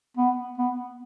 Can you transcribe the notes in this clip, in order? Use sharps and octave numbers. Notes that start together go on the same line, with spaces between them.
B3
B3